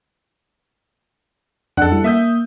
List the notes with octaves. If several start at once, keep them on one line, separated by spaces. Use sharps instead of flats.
F2 D4 A4 F#5
G3 E4
A#3 E5 D#6 G6